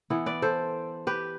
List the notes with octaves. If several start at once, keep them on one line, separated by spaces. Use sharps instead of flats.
E3 B3 E4
B4 D5
A4 C5
G4 B4